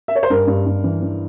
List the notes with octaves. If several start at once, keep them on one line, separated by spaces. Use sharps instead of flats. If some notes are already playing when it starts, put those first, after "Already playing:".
E5
C#5
C5
G2 A#4
G2
G2
E3
E3